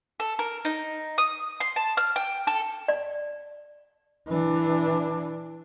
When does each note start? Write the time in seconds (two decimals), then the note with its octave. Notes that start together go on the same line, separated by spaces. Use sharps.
0.20 A4
0.39 A#4
0.65 D#4
1.18 D#6
1.60 C6
1.76 A5
1.97 F6
2.16 G5
2.47 A4
2.88 D5
4.28 E3 D4